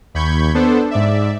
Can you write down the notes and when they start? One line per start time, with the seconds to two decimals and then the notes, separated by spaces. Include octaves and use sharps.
0.14 D#2 B5 C#6 G6 G#6
0.54 B3 D4 A4 C5
0.91 G#2 D5 E5